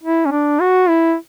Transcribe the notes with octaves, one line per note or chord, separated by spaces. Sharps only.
E4
C#4
D4
F#4
E4